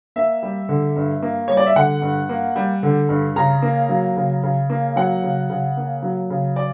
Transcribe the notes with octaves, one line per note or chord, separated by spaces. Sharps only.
A#3 E5
G3
D3
G2
A#3
G3 C#5
D5
E5
D3 F#5
G2
A#3
G3
D3
G2
C#3 A#5
A#3
F#3
C#3
C#3
A#3
F#3 F#5
C#3
C#3
A#3
F#3
C#3
D5